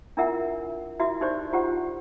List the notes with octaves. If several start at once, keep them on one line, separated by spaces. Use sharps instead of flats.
D4 E4 F4 A#4 E5 F#5
E4 F#4 E5
D#4 G4 C5 D5
F4 G4 C5 F#5